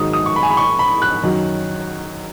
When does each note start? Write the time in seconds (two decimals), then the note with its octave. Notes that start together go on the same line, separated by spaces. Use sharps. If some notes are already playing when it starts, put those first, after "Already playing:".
Already playing: G#1 G#2 D#3 F#3 D#6
0.13 D#6
0.26 C#6
0.36 B5
0.43 G#5
0.51 B5
0.57 C#6
0.79 B5
1.02 F#6
1.23 F#2 D#3 F#3